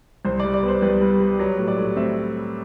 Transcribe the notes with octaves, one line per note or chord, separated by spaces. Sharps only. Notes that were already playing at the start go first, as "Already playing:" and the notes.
C2 C5
D5
G3
D5
B3
C5
C2 B4
G3
G3
F#3 B4
A2
D5
A2
C4 E5